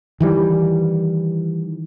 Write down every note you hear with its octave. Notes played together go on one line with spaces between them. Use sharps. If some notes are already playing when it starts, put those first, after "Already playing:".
D#3 E3 G3